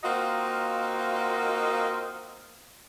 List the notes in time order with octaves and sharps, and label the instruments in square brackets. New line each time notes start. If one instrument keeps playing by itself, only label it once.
[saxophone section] A#3 C4 D#4 F4 F#4